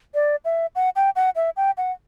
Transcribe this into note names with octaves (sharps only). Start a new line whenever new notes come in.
D5
E5
F#5
G5
F#5
E5
G5
F#5